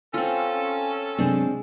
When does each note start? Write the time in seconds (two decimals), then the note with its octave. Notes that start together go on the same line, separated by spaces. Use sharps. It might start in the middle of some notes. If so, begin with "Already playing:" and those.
0.14 C4 C#4 F4 A4
1.18 C3 F#3 G#3 B3 C4 D4